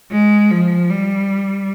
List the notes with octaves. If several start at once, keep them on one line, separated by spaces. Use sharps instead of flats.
G#3
F3
G3